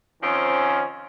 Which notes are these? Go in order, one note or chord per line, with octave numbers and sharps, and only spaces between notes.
D#3 F3 C4 C#4